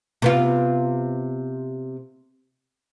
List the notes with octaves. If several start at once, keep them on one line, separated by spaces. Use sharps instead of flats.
C3 B3 F4